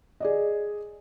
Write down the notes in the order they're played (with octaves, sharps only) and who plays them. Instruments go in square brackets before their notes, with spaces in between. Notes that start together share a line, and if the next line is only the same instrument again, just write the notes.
[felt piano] G#4 D5 D#5